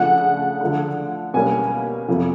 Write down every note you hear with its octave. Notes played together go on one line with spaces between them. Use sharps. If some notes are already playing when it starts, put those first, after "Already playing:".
Already playing: C#3 F3 A3 D4 F#5
D3 F3 A3 D4
B2 G3 A#3 C#4 G#5
F2 C3 F3 A3